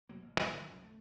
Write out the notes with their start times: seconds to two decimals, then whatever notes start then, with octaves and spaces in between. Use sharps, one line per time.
0.09 C3 F#3 A#3
0.22 A1
0.39 D#3 F#3 G3 A#3
0.54 D3 F#3 G#3
0.68 C2 F#2 F3
0.84 A3